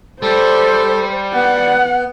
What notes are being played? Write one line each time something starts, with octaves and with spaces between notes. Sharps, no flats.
G3 G4 A4 C5
B3 F#5